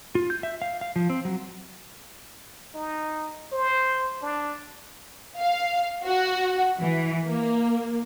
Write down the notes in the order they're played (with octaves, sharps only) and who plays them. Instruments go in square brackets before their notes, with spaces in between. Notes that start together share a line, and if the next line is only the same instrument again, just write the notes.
[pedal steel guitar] F4
G6
E5
F5
F5
F3
C4
F#3
[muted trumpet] D#4
C5
D4
[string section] F5
F#4
E3
A#3